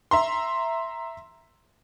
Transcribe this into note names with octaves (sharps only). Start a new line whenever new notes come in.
E5 A#5 C6